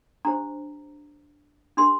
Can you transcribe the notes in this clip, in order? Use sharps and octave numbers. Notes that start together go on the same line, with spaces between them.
D4 G4 C5 A#5
D4 G4 A#4 C6